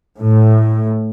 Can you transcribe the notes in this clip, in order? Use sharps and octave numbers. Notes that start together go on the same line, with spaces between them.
A2